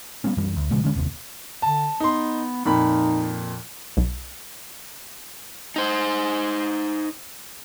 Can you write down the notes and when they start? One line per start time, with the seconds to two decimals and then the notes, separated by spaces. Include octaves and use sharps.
0.24 G3 A#3 B3 C#4
0.37 F#2 E3 G3
0.56 D2
0.71 A#2 C#3 F3 G#3
0.84 D3 G#3 C#4
0.95 F#1 D#2 C3
1.62 D3 A5
2.00 B3 D#4 C6
2.66 F2 A#2 D#4 B5
3.97 B1
5.76 D#4 C5